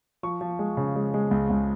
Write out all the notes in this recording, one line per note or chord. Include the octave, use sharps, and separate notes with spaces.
F3 C#6
F3
G#3
C#3
G#3
G#3
C#2
C#2